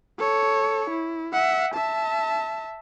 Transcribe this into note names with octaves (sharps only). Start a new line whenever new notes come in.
A4 C#5
E4
E5 F#5
E5 A5